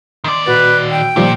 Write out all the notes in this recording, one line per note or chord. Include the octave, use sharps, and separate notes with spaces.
D#3 D5 C6
A#2 F#4 B4 A6
G5
A#2 D#3 F3 G3